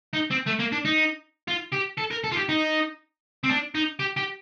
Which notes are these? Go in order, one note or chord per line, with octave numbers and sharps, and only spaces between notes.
D#4
C4
A3
A#3
D4
D#4
F4
G4
A4
A#4
A4
F4
G4
D#4
C4
D4
D#4
G4
G4